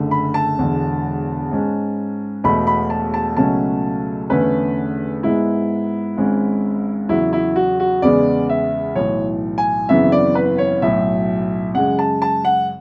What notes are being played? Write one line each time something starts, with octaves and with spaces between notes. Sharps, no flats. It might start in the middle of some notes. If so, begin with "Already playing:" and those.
Already playing: F#1 F#2 D3 A3
B5
A5
E1 E2 D3 G#3
G#2 G#3 C#4
E1 E2 B2 A3 B5
B5
A5
A5
C#2 B2 F#3 A3 C#4 A5
E2 D3 A3 C#4 B4
G#2 G#3 B3 E4
G#1 G#2 G#3 C#4
E2 C#3 F#3 E4
E4
F#4
F#4
E2 C#3 G#3 B3 D5
E5
B1 A2 E3 C#5
G#5
G#1 F#2 C#3 E3 B3 E5
D5
B4
C#5
B1 A2 F#3 E5
F#2 C#3 G#3 F#5
A5
A5
F#5